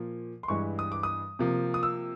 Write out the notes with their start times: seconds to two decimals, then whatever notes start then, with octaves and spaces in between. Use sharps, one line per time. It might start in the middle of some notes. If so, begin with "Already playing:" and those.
Already playing: A#2 F3 A#3
0.43 C6
0.48 G2 E3 G#3 C#6
0.79 D#6
0.92 D6
1.03 D#6
1.39 C3 F3 A#3
1.74 D#6
1.83 E6